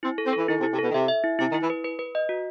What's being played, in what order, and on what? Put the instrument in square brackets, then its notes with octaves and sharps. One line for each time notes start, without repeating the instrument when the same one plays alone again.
[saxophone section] C4 [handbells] E4
[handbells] A4
[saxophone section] C4
[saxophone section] E3 [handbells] A4
[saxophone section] D#3 [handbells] E4
[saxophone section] C3
[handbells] E4
[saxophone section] C3
[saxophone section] B2 [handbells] A4
[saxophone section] D#3
[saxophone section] C3 [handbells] E5
[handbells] E5
E4
[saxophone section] C3 [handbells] E4
[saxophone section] D#3
[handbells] E4
[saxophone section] E3
[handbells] B4
B4
B4
D#5
F#4